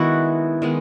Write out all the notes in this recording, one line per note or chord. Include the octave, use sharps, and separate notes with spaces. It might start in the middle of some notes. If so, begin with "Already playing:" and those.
Already playing: D#3 G#3 B3 E4 F#4
D#3 G#3 B3